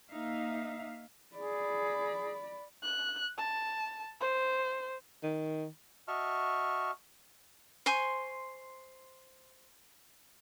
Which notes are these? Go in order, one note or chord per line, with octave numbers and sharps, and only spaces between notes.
A#3 D#4 E5 F5
G#4 D5 B5
F#6
A5
C5
D#3
F#4 D#5 E5 A5 C#6 F6
C5 G#5 C6 C#6